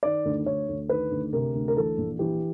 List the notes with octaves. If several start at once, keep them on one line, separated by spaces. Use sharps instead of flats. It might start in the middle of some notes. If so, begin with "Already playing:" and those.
D#3 D5
D2
D2 C#5
D2
D#3 B4
D2
C3 A#4
D2
A#4
E3 A4
A#1
E3 G4